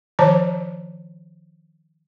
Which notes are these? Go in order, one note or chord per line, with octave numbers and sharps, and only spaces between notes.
D#3 F3 C5 C#5 A5 A#5